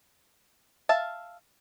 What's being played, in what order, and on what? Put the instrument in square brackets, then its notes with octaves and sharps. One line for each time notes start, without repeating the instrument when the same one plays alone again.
[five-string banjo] E5 F5 A5